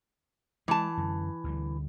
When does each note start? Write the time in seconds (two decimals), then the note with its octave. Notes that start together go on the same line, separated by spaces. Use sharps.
0.68 E3 G#3 A5
0.97 F#2 D3
1.44 D2 D3 G3